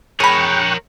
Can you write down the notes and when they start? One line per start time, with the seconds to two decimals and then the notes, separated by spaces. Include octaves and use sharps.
0.20 G#4 A#4 C#5 G5 B5 C#6 F#6